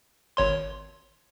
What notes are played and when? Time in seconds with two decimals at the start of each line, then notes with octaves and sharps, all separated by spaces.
0.37 G#1 C#5 C6